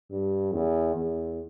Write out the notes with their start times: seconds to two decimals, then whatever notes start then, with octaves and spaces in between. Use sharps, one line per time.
0.11 G2
0.53 E2
0.96 E2